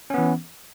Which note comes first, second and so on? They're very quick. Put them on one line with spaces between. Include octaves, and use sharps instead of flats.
C#4 B3 E3